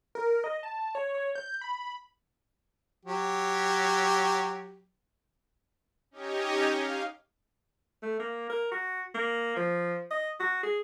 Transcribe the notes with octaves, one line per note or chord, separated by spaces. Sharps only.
A#4
D#5
A5
C#5
C#5
G6
B5
F#3 G4
C#4 D#4 G4 C#5 D#5
F5
A3
A#3
A#4
F#4
A#3
F3
D#5
F#4
G#4